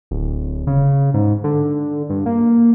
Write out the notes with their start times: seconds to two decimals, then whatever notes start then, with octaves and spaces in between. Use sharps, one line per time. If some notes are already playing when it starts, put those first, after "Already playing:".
0.11 D1
0.67 C#3
1.14 G#2
1.44 D3
2.10 G2
2.26 A#3